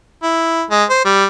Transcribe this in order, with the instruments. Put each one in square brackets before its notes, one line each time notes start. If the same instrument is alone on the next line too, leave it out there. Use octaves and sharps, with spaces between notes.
[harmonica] E4
G#3
C5
G3